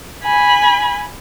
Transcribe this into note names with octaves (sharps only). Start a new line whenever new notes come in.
G#5 B5